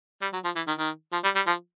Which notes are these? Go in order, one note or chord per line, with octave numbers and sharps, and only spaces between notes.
G3
F#3
F3
E3
D#3
D#3
F3
G3
G3
F3